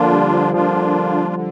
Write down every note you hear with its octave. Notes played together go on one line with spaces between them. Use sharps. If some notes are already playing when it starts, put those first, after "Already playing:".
Already playing: D3 F3 A#3 D4 F4
G3
F3
D3 F3 A#3 D4 F4
D3